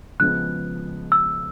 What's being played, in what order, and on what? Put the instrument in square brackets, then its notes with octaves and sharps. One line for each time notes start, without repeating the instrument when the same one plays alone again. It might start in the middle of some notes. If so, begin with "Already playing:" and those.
[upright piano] C#3 F3 G#3 B3 [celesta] F#6
[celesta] E6